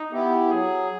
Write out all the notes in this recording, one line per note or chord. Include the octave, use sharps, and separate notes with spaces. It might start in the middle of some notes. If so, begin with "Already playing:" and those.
Already playing: D#4
B3 E4 G4
F#3 G#4